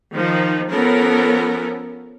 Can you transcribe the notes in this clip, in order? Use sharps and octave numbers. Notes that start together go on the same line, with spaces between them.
D#3 F3 D#4
F3 B3 C#4 A4 A#4